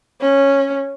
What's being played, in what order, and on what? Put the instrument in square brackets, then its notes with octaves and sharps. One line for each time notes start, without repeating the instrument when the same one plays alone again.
[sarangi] C#4